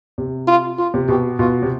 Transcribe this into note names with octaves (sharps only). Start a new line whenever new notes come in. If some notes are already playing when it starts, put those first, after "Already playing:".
C3
F4
F4
C3
B2 G4
B2 F4
C3